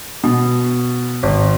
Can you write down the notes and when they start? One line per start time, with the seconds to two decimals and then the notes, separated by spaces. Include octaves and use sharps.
0.24 B2
1.23 G#1